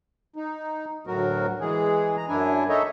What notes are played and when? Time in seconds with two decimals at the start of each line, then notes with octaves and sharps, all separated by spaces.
0.36 D#4
1.07 D2 A2 F#3 F#4 A#4
1.60 E3 G#3 G#4
2.17 A#5
2.29 F#2 D4 E4 G#5
2.69 D#4 A4 C#5 D#5 E5